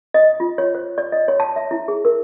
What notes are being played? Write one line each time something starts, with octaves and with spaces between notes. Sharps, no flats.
D#5
F4
C#5
C5
D5
D#5
C#5
A5
E5
E4
G#4
A#4